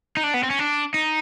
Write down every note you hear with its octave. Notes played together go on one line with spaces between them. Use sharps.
D#4
D4
B3
C4
C#4
D4
D#4